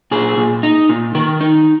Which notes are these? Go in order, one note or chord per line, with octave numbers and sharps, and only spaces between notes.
A#2 G#4
A#2
D#4
A#2
D#3 A#4
D#4